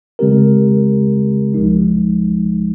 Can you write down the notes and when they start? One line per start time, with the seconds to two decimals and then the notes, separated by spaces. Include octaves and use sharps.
0.19 C#3 G#3 C4 G4 A#4
1.54 C2 C3 F3 G#3 D#4